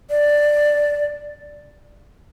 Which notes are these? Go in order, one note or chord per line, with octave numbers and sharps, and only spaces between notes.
D5